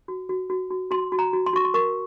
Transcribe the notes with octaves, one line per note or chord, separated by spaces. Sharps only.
F#4
F#4
F#4
F#4
F#4 C6
F#4
A#5
F#4
C6
F#4 C#6
C6
A#4 C#6